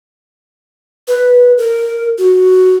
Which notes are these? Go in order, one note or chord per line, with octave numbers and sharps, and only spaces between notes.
B4
A#4
F#4